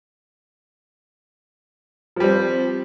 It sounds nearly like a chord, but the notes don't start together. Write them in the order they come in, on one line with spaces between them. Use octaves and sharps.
F3 G3 C4